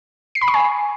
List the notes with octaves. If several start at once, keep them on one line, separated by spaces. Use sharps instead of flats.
C7
B5
C#6
G#5